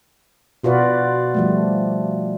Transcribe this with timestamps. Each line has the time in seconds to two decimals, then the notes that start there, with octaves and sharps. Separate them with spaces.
0.63 B2 F4 F#4 B4 D5
1.34 F3 G3 A3